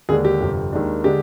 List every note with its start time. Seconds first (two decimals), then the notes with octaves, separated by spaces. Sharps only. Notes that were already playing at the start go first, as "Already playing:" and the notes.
0.09 D#2 D3 G#3 D4 G#4
0.25 G4
0.40 G1 F2 C3
0.72 D#2 D#3 G#3 D4
1.04 D3 G#3 D4 G4